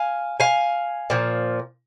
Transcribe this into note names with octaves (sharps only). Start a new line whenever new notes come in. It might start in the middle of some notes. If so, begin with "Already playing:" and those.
Already playing: F5 G#5
F5 G#5
A#2 F3